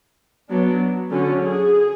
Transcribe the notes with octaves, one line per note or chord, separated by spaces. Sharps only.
F#3 B3 D4
D3 F#3 C#4
G#4